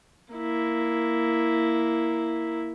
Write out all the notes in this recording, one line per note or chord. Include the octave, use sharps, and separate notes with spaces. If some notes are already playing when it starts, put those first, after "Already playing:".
A#3 E4